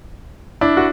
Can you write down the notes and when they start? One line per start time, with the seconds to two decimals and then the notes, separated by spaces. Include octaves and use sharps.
0.61 D4 E4
0.77 F#4